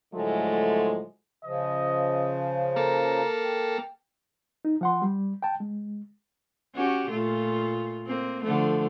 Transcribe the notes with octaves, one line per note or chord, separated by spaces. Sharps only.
A2 D3 F3 F#3 G#3 A3
C#3 F3 D#5
A#3 A4 A#5
G5
D#4
F3 F#5 C6
G3
G5 A5
G#3
C#4 F#4 G4
A#2 A3 F4
A#3 C4
D3 F3 A3